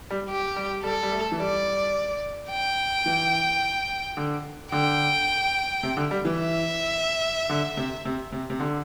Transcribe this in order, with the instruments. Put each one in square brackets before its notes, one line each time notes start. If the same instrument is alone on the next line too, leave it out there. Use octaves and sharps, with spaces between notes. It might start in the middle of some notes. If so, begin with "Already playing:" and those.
[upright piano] G3
[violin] G4
[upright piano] G3
[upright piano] G3 [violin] A4
[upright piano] G3
A3
E3
[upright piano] G3 [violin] D5
[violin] G5
[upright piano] E3
D3
[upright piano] D3 [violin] G5
[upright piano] C3
D3
G3
E3
[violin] E5
[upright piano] D3
C3
C3
C3
C3
D3